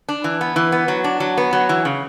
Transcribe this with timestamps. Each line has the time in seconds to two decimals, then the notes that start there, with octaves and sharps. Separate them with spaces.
0.09 D4
0.24 E3
0.41 B3
0.56 E3
0.72 B3
0.88 F#3
1.04 D4
1.20 F#3
1.38 B3
1.53 F#3
1.69 E3
1.85 C#3